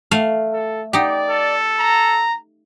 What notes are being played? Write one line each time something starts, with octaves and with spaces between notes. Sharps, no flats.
A3 F5
A4
D#4 G4 D5
A4
A#5